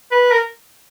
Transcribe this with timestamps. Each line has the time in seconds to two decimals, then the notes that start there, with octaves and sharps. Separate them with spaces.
0.11 B4
0.31 A#4